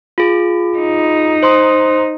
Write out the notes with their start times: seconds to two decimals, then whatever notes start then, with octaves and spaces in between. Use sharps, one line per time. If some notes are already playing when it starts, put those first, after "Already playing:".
0.18 F4 G#4
0.78 D#4
1.43 C5 C6 D#6